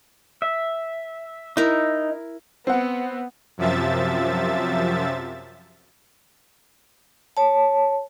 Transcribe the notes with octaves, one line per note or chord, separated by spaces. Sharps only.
E5
D#4 E4 A#4
B3 C4 F#5
F#2 C3 F3 E5 A6
C#5 A5